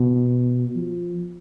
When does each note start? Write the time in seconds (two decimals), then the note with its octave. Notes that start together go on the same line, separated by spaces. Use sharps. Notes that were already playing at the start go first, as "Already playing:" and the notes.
Already playing: B2
0.76 F3